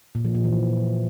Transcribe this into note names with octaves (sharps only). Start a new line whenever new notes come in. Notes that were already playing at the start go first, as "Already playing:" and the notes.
A#2
F3
A#2
E3